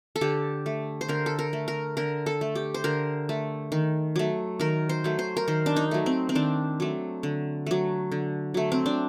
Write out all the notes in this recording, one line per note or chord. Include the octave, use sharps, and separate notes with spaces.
A4
D3 G4
A3
C5
D3 A#4
A4
A#4
A3
A#4
D3 A#4
A4
A3
G4
C5
D3 A#4
A3
D#3
F#3 A3
D#3 A#4
C5
F#3 A3
C5
A#4
D#3 C5
D4
D#4
F#3 A3
C4
C4
D#3 D4
F#3 A3
D3
F#3 A3
D3
F#3 A3
C4
D4